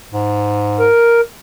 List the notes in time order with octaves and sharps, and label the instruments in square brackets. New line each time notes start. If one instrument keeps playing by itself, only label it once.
[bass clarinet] G#2
[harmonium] A#4